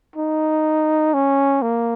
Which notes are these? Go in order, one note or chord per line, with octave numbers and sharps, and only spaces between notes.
D#4
C#4
A#3